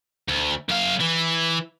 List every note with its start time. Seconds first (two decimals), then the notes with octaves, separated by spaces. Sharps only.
0.28 D2
0.69 F#2 F5
1.00 E3